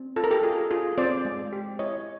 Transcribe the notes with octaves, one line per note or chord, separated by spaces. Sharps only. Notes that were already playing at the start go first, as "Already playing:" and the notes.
Already playing: C4
F4 A4
A#4
G4 A4
F4 G#4
F4 G#4
C4 C5 D5
G#3
G4
E4 C#5 D#5